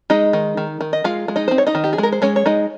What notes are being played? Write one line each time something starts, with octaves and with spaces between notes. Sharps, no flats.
G#3 D#4 D#5
D#3
D#3
D#3
D#5
G#3 F4 F5
G#3
D#4 D#5
C4 C5
C#5
D#4 D#5
D#3
G4
G#4
G#3 A#4
C5
G#3 C#4 C#5
C#5
G#3 D#4 D#5